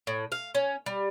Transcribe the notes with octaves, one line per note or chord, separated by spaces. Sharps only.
A2
F5
C#4
G3